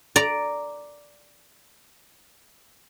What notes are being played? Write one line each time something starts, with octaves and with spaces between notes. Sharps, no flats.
D5 A#5